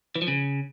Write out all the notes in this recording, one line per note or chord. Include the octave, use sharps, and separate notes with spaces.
E3
F3
C#3